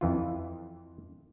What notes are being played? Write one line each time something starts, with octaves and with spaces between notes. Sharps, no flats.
F2 E3 F4